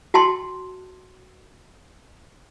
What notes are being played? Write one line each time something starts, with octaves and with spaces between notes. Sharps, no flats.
F#4 G5 A5 C6